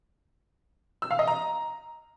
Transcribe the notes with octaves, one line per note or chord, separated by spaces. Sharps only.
E6
F5
D#5
A#5